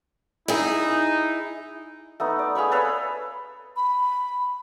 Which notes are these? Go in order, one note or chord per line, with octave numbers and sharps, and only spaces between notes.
D#4 E4 G#4
A3 B3 D#4
D5
G#4 F5 B5 C#6
A4 B4 C#5 F5
B5